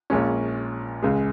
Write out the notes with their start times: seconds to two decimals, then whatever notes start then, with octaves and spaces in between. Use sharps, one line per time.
0.10 A#1 A#2 G#3 C#4
1.02 C#2 C#3 G#3